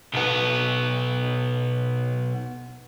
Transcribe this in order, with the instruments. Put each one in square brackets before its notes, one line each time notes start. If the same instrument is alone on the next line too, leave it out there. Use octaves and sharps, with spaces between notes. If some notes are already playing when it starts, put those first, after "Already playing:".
[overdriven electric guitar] B1 B3